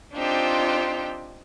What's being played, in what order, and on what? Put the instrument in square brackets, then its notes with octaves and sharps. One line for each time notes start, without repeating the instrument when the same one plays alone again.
[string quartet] C4 D4 D#4 F4 G4 C5